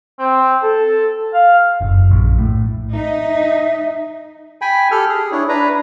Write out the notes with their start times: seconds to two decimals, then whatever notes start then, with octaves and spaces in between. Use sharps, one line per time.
0.19 C4
0.63 A4
1.34 F5
1.81 F#1
2.11 A#1
2.38 A2
2.93 D#4 E5
4.61 G5 G#5 B5
4.91 G4 A4 F6
5.09 G#4
5.32 D4 E4 C#5
5.49 D4 B4 A#5